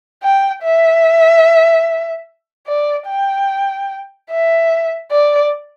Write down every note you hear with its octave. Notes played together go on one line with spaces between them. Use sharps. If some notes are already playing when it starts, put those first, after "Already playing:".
G5
E5
D5
G5
E5
D5